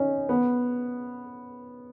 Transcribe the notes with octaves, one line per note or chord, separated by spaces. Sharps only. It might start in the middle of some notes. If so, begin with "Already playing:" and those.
Already playing: C#4 D#4
B3